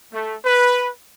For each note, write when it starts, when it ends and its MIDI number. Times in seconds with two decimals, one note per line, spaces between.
0.13 0.35 57
0.45 0.88 71